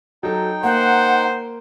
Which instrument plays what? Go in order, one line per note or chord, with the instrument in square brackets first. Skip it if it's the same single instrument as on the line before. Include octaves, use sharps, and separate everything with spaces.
[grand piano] F#3 A4 [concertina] D#4 G5
[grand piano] A#3 [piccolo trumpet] C5 [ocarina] F#5